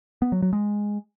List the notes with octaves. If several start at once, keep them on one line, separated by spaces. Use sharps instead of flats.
B3
F#3
F#3
G#3